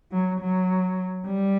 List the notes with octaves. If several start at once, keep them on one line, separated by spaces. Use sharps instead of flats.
F#3
F#3
G3